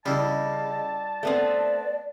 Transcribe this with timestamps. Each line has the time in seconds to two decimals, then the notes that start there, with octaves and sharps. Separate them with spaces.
0.06 C#3 G3 E4 D#5 A5
1.23 A3 B3 C4 D5